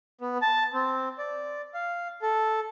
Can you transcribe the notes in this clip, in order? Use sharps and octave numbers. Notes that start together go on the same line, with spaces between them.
B3
A5
C4
D5
F5
A4